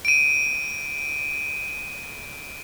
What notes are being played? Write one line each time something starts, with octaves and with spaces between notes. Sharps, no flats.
D7 D#7